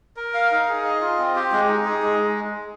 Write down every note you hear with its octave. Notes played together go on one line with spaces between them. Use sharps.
A#4
F5
D#4
G#4
D#5
F4
C4
G4
G#3
D#4
G#4
G#3